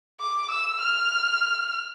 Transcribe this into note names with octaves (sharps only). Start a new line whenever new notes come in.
D6
E6
F6